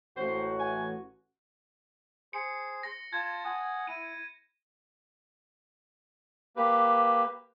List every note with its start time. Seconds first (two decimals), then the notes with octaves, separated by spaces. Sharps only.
0.17 A1 F#4 C5
0.59 G#5
2.33 G#4 C5 C#7
2.83 A#6
3.13 F4 A5 G#6
3.44 F#5 G#5 D#6
3.87 E4 D#7
6.56 A#3 G4 B4